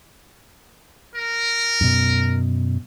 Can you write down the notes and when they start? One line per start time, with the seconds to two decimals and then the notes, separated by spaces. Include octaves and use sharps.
1.15 A#4
1.81 F#2 B2